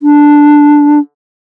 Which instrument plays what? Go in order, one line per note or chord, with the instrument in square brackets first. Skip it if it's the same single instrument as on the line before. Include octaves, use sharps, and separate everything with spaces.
[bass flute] D4